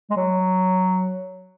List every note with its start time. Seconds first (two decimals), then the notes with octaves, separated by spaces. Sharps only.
0.10 G#3
0.16 F#3